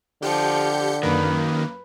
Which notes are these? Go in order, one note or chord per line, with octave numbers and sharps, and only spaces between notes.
D3 F3 G4 G6 C#7
F#2 D#3 A#3 B4